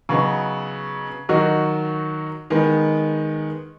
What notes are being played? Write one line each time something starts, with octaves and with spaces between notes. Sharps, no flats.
C#3 F#3 B3 D#4
D#3 F#3 D#4 F#4
D#3 G#3 B3 D#4